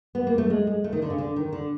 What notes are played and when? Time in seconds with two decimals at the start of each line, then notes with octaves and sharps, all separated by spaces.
0.15 B3
0.27 A#3
0.38 A3
0.50 G#3
0.67 G#3
0.84 A3
0.93 D#3
1.02 D3
1.10 C#3
1.18 D3
1.36 D#3
1.53 D3